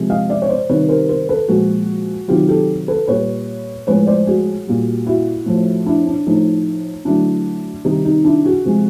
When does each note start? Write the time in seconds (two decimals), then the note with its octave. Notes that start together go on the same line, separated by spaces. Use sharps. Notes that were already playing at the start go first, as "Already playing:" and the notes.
Already playing: C3 F3 G#3
0.10 D#5 F5
0.29 D5 E5
0.42 C#5
0.49 C5 D5
0.69 C3 D#3 G3 B4 C#5
0.89 A#4 C5
1.09 A#4 C5
1.29 A4 B4
1.48 A#2 F3 G#3 F#4 G#4
2.28 C3 D#3 F#3 F4 G4
2.48 G4 A4
2.88 A4 B4
3.07 A#2 G3 B4 C#5
3.87 A2 F3 G#3 B4 C#5
4.07 C5 D5
4.27 F#4 G#4
4.67 A#2 G3
5.07 E4 F#4
5.46 A2 F3 A3
5.86 D4 E4
6.07 D4
6.26 A2 F3 A3 D#4
7.05 D3 F#3 A3 D4 E4
7.85 C3 D#3 G3 D#4
8.05 D#4
8.24 D4 E4
8.45 F#4 G#4
8.65 C3 F3 G#3